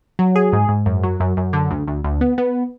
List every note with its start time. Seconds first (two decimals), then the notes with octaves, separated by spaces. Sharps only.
0.19 F#3
0.36 G#4
0.53 G#2
0.69 G#2
0.86 F#2
1.03 F#3
1.20 F#2
1.37 F#2
1.53 D3
1.70 D2
1.87 D2
2.04 D2
2.21 B3
2.38 B3